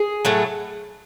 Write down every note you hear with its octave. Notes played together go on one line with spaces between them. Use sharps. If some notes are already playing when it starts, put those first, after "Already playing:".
Already playing: G#4
A2 F#3 A3